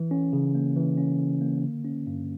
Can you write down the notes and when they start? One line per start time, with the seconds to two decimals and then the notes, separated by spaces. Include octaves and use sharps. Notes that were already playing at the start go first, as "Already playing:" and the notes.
Already playing: E3
0.11 C#4
0.33 C#3
0.55 A#3
0.76 E3
0.97 C#4
1.19 C#3
1.41 A#3
1.64 D3
1.85 C#4
2.07 G2